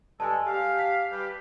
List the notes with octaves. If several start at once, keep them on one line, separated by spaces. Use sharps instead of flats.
G2 G#3 A4 G#5 A5
G4 F5
B6
G3 G4 B4